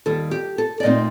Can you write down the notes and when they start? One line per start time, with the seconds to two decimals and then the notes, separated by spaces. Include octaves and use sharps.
0.06 D#2 D#3 G3 A4
0.31 G4
0.58 A4
0.80 D5
0.83 A#2 A3 C4 D#4 D#5